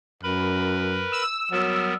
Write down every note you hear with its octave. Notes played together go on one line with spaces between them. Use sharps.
F#2 A#4 B4 B5
E6
F#3 G3 B3 A#4